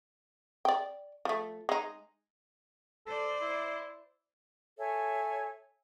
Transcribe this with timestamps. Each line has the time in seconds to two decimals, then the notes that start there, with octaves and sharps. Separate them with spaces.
0.65 D5 G5
1.25 F3 A3
1.69 G#3 D#4
3.06 A4 C5 D5
3.42 E4
4.79 A4 C#5 E5 G#5